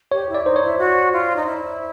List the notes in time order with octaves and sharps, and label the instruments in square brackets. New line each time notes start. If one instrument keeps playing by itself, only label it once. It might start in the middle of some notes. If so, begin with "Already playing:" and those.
[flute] G4 [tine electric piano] C#5
[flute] E4
[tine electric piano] D5
[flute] D#4 [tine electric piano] C5
[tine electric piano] C#5
[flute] E4
F#4
F4
D#4
E4